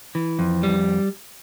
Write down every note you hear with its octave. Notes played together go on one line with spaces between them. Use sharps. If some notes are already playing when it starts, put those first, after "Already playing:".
E3
F2
G3